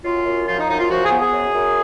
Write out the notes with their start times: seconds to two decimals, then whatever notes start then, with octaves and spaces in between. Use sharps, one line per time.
0.04 F#2 F4
0.26 F#2
0.47 F3 F4
0.59 D#4
0.69 F#2 D#4
0.79 F4
0.90 F3 F#4
1.04 G#4
1.11 B3
1.19 G#4
1.33 F#2
1.54 F#2